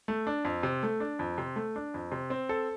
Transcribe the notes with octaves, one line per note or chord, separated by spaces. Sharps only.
A3
D4
F2
C3
A3
D4
F2
C3
A3
D4
F2
C3
C4
A4